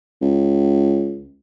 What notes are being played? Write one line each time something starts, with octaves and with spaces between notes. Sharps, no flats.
C#2